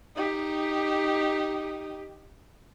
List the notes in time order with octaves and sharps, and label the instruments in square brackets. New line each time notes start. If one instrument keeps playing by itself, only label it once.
[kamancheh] D#4 G4